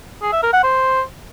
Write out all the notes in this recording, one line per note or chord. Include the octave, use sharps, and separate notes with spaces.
G#4
E5
A#4
F#5
C5